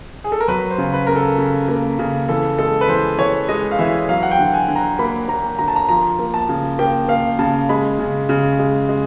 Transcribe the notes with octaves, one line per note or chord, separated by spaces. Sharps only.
G#4
A4
A#4
F#3 B4
C5
C#3
B4
C#3 A#4
A4
C#3
A#3
C#3
E3 A4
G#3 A4
B4
E3 C5
E3 C#5
G#3 D#5
F5
E3 E5
F#3 F5
F#5
G5
D3
G#5
D3
A#5
A#3 B5
A#3 A#5
D3 A#5
A5
A#5
F3 A#5
A#3
A5
C#3
A#3 G5
A#3 F5
C#3 A5
G#3 B5
C#3
C#3
G#3
G#3